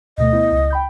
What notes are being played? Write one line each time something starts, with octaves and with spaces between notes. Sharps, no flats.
D2 B2 A3 D#5
B3 E4
C#2
G5 B5 G6